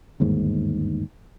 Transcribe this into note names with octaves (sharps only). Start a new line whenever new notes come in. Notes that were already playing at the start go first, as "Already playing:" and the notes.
G1 D#2 G#2